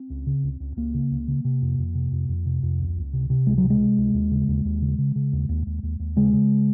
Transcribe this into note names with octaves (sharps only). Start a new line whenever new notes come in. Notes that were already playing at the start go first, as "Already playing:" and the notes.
Already playing: C4
C#2
C#3
C#2
C#2
C#2 A#3
C#3
C#2
C#3
C3
F2
F2
C3
F2
F2
C3
F2
C#2
C#2
C3
C3
C#2 G#3
F#3
C3
G#3
C3
C#2
D#2
C#3
D#2
D#2
C#3
C#3
C#3
D#2
D#2
D#2
D#2
D#2
C#3 G#3
C#3